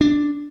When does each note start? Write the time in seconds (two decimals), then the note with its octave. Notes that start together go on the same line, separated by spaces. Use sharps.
0.01 D4